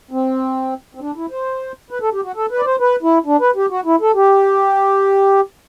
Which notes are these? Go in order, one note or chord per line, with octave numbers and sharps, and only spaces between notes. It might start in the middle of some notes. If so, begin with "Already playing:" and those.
C4
C4
D4
E4
C5
B4
A4
G4
F#4
A4
B4
D5
C5
B4
E4
D4
B4
G4
F#4
E4
A4
G4